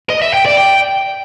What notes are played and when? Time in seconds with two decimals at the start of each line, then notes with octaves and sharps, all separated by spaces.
0.10 D#5
0.22 E5
0.34 G5
0.45 D5
0.57 G5